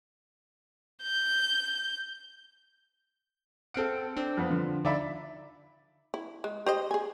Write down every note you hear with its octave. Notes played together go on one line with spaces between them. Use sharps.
G6
C4 A4 F5 F#5 D7
C4 D4
F2 B3
D3 F3
D3 D#4 E4 D5 E5 B5
E4
G#3
G4 C5 D#5
G#4 G#5